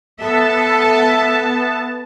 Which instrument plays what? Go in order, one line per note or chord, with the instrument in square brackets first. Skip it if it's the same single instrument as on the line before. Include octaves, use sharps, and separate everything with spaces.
[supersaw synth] B3 A5 [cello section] A4 E5